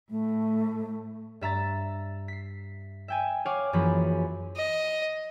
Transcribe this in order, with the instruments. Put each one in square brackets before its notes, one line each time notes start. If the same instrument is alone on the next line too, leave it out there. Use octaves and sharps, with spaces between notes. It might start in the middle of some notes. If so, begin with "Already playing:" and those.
[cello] A2 [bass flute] A3
[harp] G2 E5 A#5 A6
B6 C7
E5 G5 G#5
C#5 F5 F#5 G#5 D6
F#2 E3 F3 A#3 G#4 B5
[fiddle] D#5